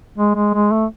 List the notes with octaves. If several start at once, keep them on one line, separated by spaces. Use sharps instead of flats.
G#3
G#3
G#3
A3